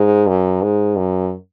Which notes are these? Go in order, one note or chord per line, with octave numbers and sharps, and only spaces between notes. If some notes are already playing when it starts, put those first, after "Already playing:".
Already playing: G#2
F#2
G#2
F#2